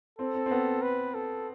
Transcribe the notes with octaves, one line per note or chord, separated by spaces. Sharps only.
C4 A4
C4
C4
B3
B4
A4